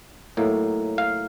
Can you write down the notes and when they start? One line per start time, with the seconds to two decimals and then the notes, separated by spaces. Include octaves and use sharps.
0.37 A2 F#3 A#3 D#4
0.98 F5